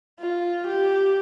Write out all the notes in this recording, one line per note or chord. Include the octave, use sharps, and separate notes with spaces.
F4
G4